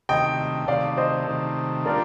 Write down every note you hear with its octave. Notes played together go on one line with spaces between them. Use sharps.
C3 D#3 A3 D#5 G5
C3 D#3 A3 D5 F5
C5 D#5
C3 D#3 A3
D3 G3 A#3 F4 A#4 D5